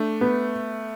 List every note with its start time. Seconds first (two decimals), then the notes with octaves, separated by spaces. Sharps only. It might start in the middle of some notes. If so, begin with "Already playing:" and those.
Already playing: A3 D4
0.21 B3